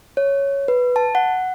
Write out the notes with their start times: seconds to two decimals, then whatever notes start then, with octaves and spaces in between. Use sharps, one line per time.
0.17 C#5
0.68 B4
0.96 A5
1.15 F#5